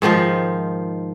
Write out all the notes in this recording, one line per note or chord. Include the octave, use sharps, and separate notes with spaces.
G#2 D#3 F3 F4